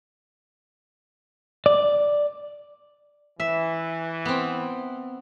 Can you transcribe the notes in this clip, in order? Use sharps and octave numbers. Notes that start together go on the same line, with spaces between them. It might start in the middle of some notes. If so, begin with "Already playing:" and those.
D5
E3 E5
B3 C4